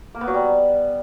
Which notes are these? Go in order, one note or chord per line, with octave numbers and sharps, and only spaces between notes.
A#3
B3
F#3
G3